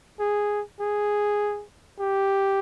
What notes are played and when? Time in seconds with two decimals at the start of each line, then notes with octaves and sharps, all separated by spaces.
0.20 G#4
0.80 G#4
2.00 G4